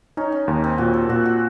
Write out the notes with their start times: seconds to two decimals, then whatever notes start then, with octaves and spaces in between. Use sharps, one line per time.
0.17 C#4 D#4
0.32 C#4
0.48 D#2 C#4
0.64 C4
0.78 A#2 F#4
0.94 A4
1.09 A#2 F#4
1.25 F#4